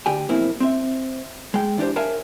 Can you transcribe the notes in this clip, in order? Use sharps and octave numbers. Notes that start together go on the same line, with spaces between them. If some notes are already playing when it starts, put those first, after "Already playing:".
D2 G4 G5 G#5
B1 F2 A#3 C4 E4
C4 E5
G#3 G5
E3 D4 D#4 G4 C5
A#4 C#5 E5 F5 G#5 A5